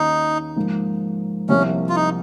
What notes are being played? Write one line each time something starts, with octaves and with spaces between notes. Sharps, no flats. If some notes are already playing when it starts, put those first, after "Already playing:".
Already playing: D#2 D#3 A#3 C#4 D#4
G#2 F3 A#3
C2 C3 F3 A#3 C#4
F4
D#4